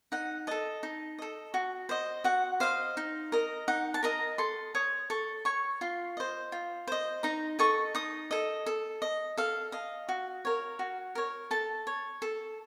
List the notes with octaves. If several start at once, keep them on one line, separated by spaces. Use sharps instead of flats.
D#4 F#5
A4 D#5 A5
D#4
A4 D#5
F#4
C5 D#5
F#4 F#5
C5 D#5 F5
D#4
A#4 D#5
D#4 F#5
A5
A#4 D#5 A#5
A4 C6
C#5 D#6
A4 C#6
C#5 C#6
F4 C6
C5 D#5
F4
C5 D#5
D#4 A#5
A4 D#5 C#6
D#4 D#6
A4 D#5
A4
D#5
A4 F5
D#5 F5
F#4
A#4 C#5
F#4
A#4 C#5
A4 A5
C#5
A4